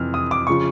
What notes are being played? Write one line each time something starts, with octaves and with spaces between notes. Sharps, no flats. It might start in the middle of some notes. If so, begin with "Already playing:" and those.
Already playing: F2 C3 E3 F6
D#6
D6
C#3 F3 C#6